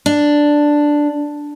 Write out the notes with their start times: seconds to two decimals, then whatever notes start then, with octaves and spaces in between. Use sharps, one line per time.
0.06 D4